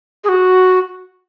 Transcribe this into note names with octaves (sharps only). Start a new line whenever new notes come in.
G#4
F#4